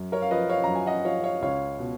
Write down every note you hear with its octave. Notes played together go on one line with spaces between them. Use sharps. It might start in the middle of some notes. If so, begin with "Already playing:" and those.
Already playing: F#2
A#4 C#5
F5
F3 B4 D#5
C#5 F5
F#2 A#5
G#5
D#5 F#5
F3 C#5 F5
C#5 F5
C#2 C#5 F5
B2